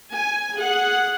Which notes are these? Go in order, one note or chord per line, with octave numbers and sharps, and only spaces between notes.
G#5
G#4 F#5